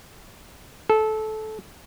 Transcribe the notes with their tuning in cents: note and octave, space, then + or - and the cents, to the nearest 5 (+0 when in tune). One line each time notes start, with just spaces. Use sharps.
A4 -20